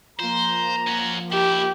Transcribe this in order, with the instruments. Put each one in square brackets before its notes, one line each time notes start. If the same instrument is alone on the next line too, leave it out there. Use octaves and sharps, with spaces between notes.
[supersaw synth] F3 A#3 [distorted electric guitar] C5 [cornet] A#5
[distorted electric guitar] C#4 F#4
[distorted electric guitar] D#2 E4 [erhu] G4